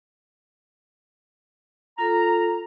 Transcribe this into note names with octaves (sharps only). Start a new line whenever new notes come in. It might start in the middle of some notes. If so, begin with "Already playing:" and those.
F4 A4 A#5